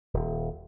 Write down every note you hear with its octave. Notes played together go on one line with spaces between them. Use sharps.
D#1